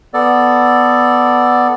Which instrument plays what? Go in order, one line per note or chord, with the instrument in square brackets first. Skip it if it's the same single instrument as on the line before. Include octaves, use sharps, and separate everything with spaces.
[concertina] B3 A4 D5